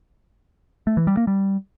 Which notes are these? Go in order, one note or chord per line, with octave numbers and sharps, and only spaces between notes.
A3
E3
G3
A#3
G3